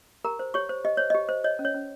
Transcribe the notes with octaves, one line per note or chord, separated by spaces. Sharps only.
G4 A#4 A#5
C5
G4 C#5 C#6
C5
G4 D#5
C5 C#5
G4 D#5
C5
C#5 D#5
C#4
C#5
C#4